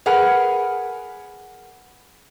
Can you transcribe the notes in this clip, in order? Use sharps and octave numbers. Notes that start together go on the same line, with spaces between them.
G#4 A#4 B4 F#5 G#5